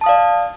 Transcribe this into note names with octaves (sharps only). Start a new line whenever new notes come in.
D5 F5 A5 D#6